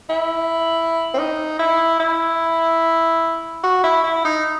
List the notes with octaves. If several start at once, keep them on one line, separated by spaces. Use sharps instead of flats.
E4
C4
D#4
E4
E4
F#4
E4
E4
D#4